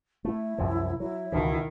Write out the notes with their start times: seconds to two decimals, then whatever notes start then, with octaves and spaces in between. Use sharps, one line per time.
0.25 A3 E4
0.58 C2 F#2 F3
1.00 F#3 E4
1.32 C#2 B2 D#3 E3